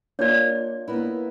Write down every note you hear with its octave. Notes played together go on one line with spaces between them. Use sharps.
A#3 D4 F4 C#5 D5
A#3 B3 E4